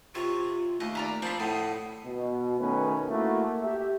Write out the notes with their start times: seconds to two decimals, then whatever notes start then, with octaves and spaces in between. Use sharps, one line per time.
0.15 C3 F4 C#5
0.80 D#2 A3 D#5
0.95 D5 A#5 B5
1.22 F3 C4 D4 C5 B5
1.40 A2 D#5 F#5
2.05 B2
2.58 B2 D#3 A3 C#4 B4
3.08 A3 A#3 E4 F#4
3.61 G4 E5